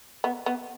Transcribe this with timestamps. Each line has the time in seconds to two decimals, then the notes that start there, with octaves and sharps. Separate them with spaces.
0.24 B3
0.46 B3